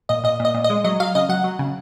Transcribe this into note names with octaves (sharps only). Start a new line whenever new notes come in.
A#2 D#5
A#2 D#5
A#2
D#5
A#2
D#5
G#3
F#3 D#5
F#3 F5
C#3 D#5
F#3 F#5
F#3
C#3